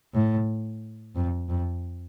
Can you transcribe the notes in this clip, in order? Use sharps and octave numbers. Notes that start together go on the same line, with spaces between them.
A2
F2
F2